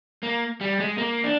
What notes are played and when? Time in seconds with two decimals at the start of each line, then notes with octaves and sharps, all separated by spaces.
0.23 A#3
0.61 G3
0.80 G#3
0.98 A#3
1.24 D4